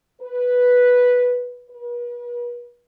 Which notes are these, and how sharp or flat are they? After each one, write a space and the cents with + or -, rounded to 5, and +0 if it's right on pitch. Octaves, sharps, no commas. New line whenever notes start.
B4 -5
B4 -40